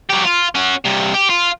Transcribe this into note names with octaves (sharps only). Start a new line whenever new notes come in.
F#3 G4
F4
C#4 F#4
G2 C3
G4
F4